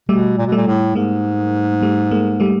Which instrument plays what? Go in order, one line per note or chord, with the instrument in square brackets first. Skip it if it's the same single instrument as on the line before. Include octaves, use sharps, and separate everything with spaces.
[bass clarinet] B2 [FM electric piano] G3 A3
[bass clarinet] A#2
B2
[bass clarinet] A#2 [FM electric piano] G3 A3
[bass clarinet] A2
[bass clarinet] G#2 [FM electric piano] G#3 A#3
[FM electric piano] G3 A3
G#3 A#3
G3 A3